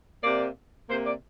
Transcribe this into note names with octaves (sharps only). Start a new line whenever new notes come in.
C3 A#3 D5
C3 A#3 C5
D5